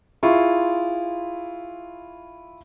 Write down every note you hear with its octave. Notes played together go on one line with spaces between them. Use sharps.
E4 F4 G#4 C#6